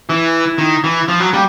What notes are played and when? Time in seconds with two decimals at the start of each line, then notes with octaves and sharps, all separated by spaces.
0.09 E3 E4
0.58 D#3
0.84 E3
0.98 E4
1.08 F3 F4
1.20 F#3
1.33 G3 A#3